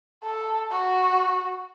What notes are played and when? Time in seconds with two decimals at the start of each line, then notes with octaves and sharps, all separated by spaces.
0.23 A4
0.71 F#4